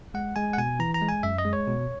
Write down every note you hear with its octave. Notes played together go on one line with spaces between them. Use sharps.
G#3 F#5
G#3 G#5
F#5
B2 G#5
E3 A#5
A#5
G#3
G#5
F#2 E5
D#5
G#3
C#5
B2